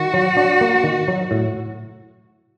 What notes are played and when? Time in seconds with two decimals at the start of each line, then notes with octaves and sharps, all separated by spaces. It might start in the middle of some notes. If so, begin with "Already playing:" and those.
Already playing: D#3 F#4
0.14 F#3
0.37 D4
0.61 A#3
0.84 D#3
1.08 F#3
1.31 A2